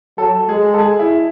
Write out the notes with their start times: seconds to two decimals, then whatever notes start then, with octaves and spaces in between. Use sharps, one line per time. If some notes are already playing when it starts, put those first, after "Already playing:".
0.18 F#3 A4
0.49 G#3 G#4
0.74 A4
0.79 G#4
0.99 E4